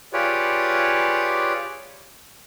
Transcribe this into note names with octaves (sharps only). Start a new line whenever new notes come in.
F4 G4 G#4 B4 C#5 D5